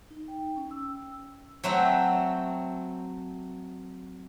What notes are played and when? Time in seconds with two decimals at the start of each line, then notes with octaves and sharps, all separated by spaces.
0.10 D#4
0.28 G5
0.56 C#4
0.71 E6
1.63 F#3 A3 C4 E5 F#5 G5